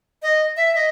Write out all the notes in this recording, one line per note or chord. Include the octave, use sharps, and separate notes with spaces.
D#5
E5
D#5